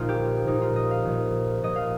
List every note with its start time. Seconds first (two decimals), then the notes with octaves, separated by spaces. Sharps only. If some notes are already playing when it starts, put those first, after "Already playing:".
Already playing: A#1 A#2 D#4 F4
0.09 G4
0.47 A#1 A#2 D#4
0.62 F4
0.76 D#5
0.91 F5
1.05 A#1 A#2
1.63 A#1 A#2 D#5
1.76 F5